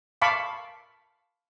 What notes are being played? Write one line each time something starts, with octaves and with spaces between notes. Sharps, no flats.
F5 A5 B5 C#6 D6